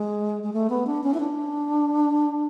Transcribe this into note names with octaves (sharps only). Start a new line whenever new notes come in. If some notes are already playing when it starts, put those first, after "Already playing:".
Already playing: G#3
G#3
A3
B3
D4
C#4
E4
D4